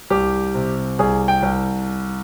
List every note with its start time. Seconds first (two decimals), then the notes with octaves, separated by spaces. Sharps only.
0.10 C2 G4
0.55 C3
0.99 C2 G#4
1.28 G5
1.43 C2